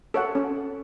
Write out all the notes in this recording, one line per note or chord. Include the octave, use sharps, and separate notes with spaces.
A4 C#5 F#5
C#4